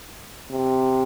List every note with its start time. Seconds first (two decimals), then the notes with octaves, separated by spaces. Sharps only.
0.51 C3